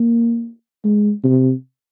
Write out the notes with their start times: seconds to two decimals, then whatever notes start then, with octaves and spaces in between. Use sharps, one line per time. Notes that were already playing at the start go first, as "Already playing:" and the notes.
Already playing: A#3
0.84 G#3
1.24 C3